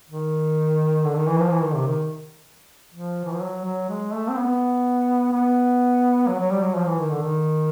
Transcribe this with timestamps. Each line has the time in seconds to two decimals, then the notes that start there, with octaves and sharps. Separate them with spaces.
0.08 D#3
1.03 D3
1.15 D#3
1.27 E3
1.39 F3
1.51 E3
1.63 D#3
1.75 C3
1.87 D#3
2.94 F3
3.25 E3
3.33 F3
3.41 F#3
3.65 F#3
3.89 G#3
4.13 A3
4.29 C4
4.37 B3
5.32 B3
6.28 F#3
6.39 F#3
6.51 G3
6.63 F#3
6.75 F3
6.87 E3
6.99 D#3
7.10 D3
7.23 D#3